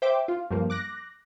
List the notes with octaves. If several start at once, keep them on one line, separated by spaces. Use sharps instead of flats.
C5 E5 G5 D6
F4
G2 F3 A#3
D6 F#6 A#6